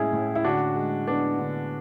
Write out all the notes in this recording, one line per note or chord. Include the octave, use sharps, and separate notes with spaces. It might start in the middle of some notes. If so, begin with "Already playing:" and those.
Already playing: A2 G#3 C#4 E4 G#4
A2
E4
D3 D4 F#4
G#3
B3 D4
D3